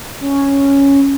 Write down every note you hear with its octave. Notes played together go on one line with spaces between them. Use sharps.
C#4